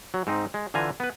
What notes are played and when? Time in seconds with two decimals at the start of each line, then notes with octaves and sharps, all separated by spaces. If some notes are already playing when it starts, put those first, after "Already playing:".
0.14 F#3
0.27 G#2 C4 D#4
0.54 G#3
0.74 D3 E3 F4 G#5 A#5
1.00 B3 B4